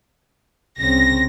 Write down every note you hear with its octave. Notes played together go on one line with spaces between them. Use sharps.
C2 C#3 C4 A#6